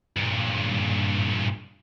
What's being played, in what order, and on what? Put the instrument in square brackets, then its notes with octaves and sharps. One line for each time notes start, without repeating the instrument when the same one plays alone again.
[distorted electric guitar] G2 A#2